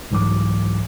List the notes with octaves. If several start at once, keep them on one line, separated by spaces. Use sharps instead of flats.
C2 G#2 E3 F#3 D6